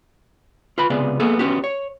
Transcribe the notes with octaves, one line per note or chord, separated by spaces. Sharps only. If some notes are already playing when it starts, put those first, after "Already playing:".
F4 B4 B5
C#2 C3 B3 G#4 D5
A#3 B3 G#4 A4
B3 C#4 F#4 G4
C#5